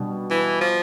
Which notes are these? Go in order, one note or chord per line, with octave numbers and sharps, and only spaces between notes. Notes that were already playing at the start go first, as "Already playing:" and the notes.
Already playing: B2 G3 B3 D4
E3
F3